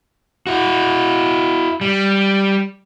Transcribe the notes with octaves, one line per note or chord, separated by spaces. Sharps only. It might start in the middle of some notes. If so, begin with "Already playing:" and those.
E4 F#4
G3